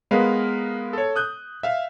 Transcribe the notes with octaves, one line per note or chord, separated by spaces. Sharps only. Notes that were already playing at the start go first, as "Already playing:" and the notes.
G#3 B3 A#4 B4 F5
A4 C#5
D#6 F#6 G6
E5 F5